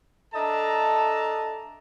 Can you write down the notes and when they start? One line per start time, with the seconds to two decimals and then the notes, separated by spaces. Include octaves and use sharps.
0.34 D4 A4 D#5 E5 A5 A#5